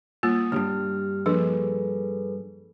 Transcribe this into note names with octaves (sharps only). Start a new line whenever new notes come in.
G3 A#3 F4 D#6
B1 G2 G4 F6
F3 A#3 D4 G#4 A4 B4